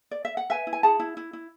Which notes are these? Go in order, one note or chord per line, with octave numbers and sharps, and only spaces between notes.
D5
E5
F#5
B4 E5 G#5
E4
G#5
G#4 F#5 A5
E4
E4
E4